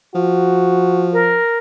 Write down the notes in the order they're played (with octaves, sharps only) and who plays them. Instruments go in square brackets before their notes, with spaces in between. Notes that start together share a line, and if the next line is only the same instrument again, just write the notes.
[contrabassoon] F3 [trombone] F#4
[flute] A#4